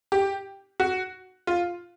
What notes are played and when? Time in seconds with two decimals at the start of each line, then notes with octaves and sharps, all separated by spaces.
0.12 G4
0.80 F#4
1.47 F4